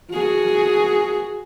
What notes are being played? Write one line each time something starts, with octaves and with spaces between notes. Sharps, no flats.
F#4 G#4